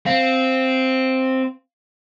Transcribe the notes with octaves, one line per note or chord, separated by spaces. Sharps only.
C4 F5